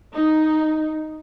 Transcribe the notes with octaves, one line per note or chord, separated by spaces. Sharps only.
D#4